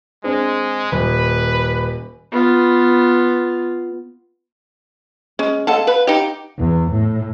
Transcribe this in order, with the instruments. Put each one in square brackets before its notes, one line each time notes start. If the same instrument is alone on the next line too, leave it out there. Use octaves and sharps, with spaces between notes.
[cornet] G#3 [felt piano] C4 D4 G#4
[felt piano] D#1 [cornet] B4
[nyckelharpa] B3 F4
[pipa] G#3 [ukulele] C#4
[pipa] G#3 A4 [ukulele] F5 F#5 A5
[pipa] B4
D#4 G4
[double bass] E2
A2